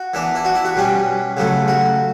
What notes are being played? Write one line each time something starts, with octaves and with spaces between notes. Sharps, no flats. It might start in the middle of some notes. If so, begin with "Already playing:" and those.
Already playing: F#4
E3 B3 D4
E4
F#4
E4
F#4
B2 G3 C#4
C#3 F#3 A3
F#4